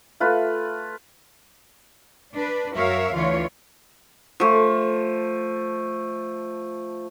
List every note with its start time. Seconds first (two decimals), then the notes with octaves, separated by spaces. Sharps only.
0.20 A3 F4 B4
2.34 D4 B4
2.75 F#2 F#4 A#4 C#5 E5 F5
3.13 D2 D3 E3 F4 C#5
4.40 F3 A3